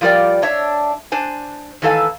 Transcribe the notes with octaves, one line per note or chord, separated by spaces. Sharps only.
F3 G3 F4 A#4 D5 G5
D4 C#5 E5
D4 C5 G#5
D#3 E3 A3 A4 F5 G#5